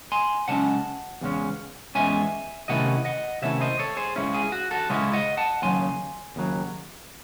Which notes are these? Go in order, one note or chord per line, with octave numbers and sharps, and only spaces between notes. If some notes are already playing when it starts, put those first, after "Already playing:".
G#5 C6
C#3 G#3 C#4 F#5 A5
E2 C#3 G#3 C#4
E2 C#3 G#3 C#4 E5 G#5
C3 D#3 A3 C#4 E4 D#5 F#5
D#5 F#5
C3 D#3 A3 C#4 E4 C#5 E5
C5 D#5
A4 C#5
G#4 C5
C#2 C#3 G#3 C#4 E4
G#4
F#4
F#4 A4
C#2 C#3 G#3 C#4 E4
D#5 F#5
F#5 A5
D#2 C#3 F#3 G#5 C6
D#2 C#3 F#3